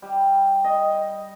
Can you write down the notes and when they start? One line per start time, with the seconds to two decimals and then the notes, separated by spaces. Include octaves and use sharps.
0.02 G3
0.64 D#5